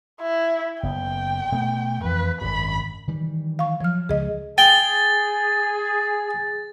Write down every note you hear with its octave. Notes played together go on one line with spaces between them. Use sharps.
E4
F#1 B3 G5
B2 A3 B3
F2 E3 B4
G#1 F#2 B5
D#3 E3 G3
F5 C#6
F3 F#3 F6
C#2 G#4 D#5
G#4 G5 A6